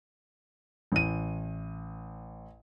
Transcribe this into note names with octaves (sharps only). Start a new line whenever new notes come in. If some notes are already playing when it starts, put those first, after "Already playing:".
A1 D#7